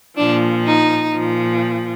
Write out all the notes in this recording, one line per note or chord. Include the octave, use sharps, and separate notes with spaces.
A#2 F3 D4
D#4
A#2 F3